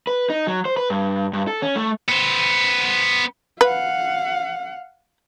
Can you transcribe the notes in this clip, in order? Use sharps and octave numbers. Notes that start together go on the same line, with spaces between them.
B4
D#4
F#3
C5
B4
G2
G2
A4
C#4
A3
B3 C5
B4 F5 F#5